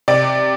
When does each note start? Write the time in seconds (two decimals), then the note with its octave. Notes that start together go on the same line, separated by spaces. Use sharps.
0.08 C3 D5